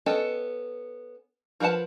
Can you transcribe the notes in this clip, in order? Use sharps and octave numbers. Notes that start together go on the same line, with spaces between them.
B3 C#4 A4 D#5 G5
F3 A#4 B4 F#5 A5